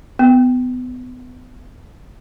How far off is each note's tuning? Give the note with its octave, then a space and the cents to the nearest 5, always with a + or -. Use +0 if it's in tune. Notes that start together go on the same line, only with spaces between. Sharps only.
B3 +25